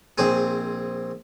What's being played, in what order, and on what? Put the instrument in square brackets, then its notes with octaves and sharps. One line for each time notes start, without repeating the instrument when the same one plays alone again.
[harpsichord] A#1 C4 G#4